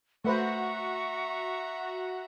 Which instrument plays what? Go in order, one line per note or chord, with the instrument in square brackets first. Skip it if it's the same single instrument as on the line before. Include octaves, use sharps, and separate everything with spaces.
[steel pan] A3 B4 C5 [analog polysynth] F#4 F#5 [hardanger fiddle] E5 A#5 [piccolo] C#6